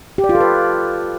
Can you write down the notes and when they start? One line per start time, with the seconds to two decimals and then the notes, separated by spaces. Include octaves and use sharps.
0.18 G4
0.24 D5
0.29 F4
0.35 A4
0.40 B4